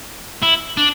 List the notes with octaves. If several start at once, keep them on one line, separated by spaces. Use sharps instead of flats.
E4
D4